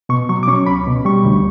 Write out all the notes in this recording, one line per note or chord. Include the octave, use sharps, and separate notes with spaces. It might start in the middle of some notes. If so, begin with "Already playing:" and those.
B2 C#6
F#3 C#6
D6
C#4 C#6
C#2 B5
B2
G3 C#6
D2